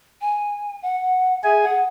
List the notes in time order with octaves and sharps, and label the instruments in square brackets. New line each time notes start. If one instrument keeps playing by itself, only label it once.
[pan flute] G#5
F#5
[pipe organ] G#4 G#5 [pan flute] E5
[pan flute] F#5